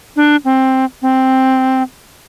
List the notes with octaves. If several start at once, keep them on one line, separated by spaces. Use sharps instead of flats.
D4
C4
C4